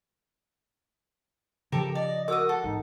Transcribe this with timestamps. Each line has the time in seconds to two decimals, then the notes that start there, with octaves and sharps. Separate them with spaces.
1.72 C#3 F3 G4 A4 A#4
1.95 D5 D#5
2.28 F#4 A#4 D#5 D6 E6
2.49 A4 F#5
2.64 G#1 D#4